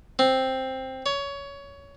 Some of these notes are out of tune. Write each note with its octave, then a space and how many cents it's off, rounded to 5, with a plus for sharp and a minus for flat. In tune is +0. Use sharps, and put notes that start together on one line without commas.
C4 +5
C#5 +20